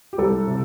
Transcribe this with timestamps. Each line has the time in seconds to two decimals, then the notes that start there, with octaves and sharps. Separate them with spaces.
0.13 G4
0.18 C2 A4
0.47 C3